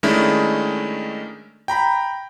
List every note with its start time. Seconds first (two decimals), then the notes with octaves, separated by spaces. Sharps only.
0.03 D#3 G#3 A3 C#4 D4 E4
1.68 G5 A#5 B5